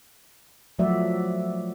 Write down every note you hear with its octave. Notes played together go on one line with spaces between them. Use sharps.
F3 F#3 A3 F#4 D5 E5